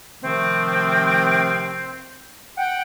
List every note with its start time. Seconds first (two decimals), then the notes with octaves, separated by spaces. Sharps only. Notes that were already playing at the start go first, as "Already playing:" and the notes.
0.21 C3 D#3 F3 A3 C4
2.58 F#5 G5